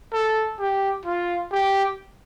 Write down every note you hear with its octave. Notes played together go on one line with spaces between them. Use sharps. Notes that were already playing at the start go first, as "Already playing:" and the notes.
A4
G4
F4
G4